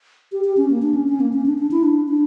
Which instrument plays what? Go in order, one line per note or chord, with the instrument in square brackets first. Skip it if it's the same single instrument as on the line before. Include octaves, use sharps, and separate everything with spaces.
[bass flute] G4
G4
C#4
A#3
D4
C#4
C#4
A#3
C#4
D4
D4
E4
D4
D4